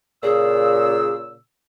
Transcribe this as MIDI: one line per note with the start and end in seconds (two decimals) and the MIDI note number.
0.23 1.38 46
0.23 1.38 49
0.23 1.14 68
0.23 1.38 88